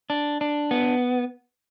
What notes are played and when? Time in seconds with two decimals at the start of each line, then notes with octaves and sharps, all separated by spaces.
0.10 D4
0.41 D4
0.71 B3